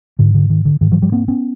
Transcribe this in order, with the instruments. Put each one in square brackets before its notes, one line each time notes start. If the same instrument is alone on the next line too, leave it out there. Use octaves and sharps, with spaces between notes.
[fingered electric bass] G#2 D3
D3
D#3
D3
G#2 D#3
E3 F#3
F3 G3
A#3 C4
B3 C#4